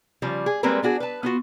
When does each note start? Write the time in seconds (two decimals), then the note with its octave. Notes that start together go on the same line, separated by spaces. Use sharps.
0.22 C#3 F3 G3
0.46 G#4
0.63 G3 G#3 A#3 C4 A#4 B4
0.82 B3 D4 F#4 G#4
1.00 B4 A5
1.23 B3 F4 F#4